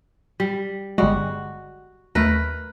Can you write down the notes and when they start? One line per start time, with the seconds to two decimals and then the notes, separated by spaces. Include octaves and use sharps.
0.40 G3
0.98 G1 G3 G#3 F#4
2.15 D#2 A3 A#4 B4